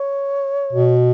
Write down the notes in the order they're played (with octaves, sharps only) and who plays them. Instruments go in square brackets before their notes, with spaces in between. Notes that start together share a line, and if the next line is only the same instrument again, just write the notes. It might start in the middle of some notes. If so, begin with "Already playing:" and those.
Already playing: [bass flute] C#5
[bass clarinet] B2